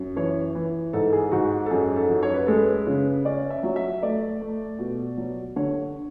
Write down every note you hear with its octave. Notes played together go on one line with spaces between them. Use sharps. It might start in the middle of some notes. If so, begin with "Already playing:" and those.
Already playing: F#2
E3 C#5
E3
G#2 A4
G#4
G#2 F#4
A4
F#2 G#4
A4
F#2
C#5
B4
G#3 A4
B4
C#3
C#4 D5
E5
F#3
E5
A3 D5
A3
B2
F#3
D3 C#5